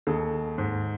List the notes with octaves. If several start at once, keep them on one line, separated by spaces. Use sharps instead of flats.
D#2 G#4 A4
G#2